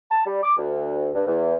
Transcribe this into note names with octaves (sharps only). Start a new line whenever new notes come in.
A5
G3
D6
D2
G2
E2